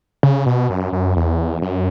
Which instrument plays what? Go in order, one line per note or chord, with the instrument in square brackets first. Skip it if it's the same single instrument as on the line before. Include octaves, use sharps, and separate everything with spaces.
[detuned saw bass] C#3
B2
F#2
F#2
E2
F#2